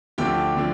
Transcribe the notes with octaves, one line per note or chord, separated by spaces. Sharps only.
D2 D3 F3 G4 G5
D3 F3